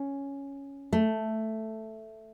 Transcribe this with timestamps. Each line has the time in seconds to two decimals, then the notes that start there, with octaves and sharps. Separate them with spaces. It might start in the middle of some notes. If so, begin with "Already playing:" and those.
Already playing: C#4
0.93 A3